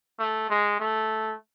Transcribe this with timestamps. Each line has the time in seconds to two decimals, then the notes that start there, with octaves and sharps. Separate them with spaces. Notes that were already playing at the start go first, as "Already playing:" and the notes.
0.19 A3
0.50 G#3
0.80 A3